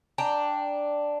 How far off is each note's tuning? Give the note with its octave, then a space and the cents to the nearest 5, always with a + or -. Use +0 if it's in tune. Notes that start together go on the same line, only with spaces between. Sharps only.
D4 +0 G5 +0 A#5 -10